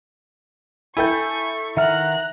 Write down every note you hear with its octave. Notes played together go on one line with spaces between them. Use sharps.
E4 A4 G5 G#5 B5 C#6 G6
D#3 E5 F#5 A#5 F6 F#6